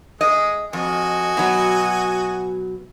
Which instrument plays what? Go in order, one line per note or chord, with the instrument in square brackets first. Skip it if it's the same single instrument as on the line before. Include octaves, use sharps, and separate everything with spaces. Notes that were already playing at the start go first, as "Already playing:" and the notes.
[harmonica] G#3 [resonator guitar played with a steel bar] D#5
[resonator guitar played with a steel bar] F2 [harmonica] F#4 D#5 G#5
[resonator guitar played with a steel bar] B2 F#3